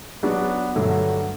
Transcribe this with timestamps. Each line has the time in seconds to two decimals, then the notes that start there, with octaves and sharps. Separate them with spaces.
0.23 F#3 B3 D4 F#4
0.75 G2 D3 F#3 A3